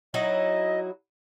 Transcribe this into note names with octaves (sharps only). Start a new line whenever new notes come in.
F#3 D#4 E4 D#5